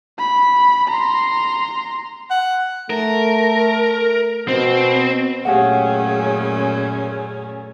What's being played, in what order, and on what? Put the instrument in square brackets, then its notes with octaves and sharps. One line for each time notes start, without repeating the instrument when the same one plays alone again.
[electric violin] B5
A#5 C6
[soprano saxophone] F#5
[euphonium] A3 [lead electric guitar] A#4
[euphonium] B2 [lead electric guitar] C4
[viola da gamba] F#2 A#2 A3 [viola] C#4 G#4 [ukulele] G4 F5 F#5